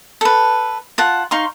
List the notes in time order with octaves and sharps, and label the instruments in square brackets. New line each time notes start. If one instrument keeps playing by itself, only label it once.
[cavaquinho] A4 B4
F4 F#5 A5
D#4 F5 C6 C#6